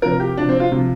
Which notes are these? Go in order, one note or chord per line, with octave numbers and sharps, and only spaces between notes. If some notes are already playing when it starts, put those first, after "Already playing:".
C3 F3 A#4
G4
C3 F3 D4
C4
F4
C3 F3